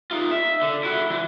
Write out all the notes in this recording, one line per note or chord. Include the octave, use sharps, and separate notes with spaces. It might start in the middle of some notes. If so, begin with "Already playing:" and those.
D#4 F4
E5
D3
E4 F#4
E3